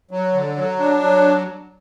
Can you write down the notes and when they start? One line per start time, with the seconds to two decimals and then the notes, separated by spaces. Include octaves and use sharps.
0.11 F#3
0.33 D3
0.56 F#3
0.79 D4
1.02 F#3